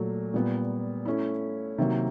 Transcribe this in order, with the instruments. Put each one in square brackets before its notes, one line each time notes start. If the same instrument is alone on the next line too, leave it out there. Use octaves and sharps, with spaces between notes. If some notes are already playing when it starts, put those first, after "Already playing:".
Already playing: [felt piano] A#2 F#3 A3
A#2 G3 B3
A3 C#4 E4
C3 D#3 F#3 A#3